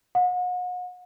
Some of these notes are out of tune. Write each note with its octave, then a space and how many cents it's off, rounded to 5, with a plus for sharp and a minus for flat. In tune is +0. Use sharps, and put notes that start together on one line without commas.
F#5 -40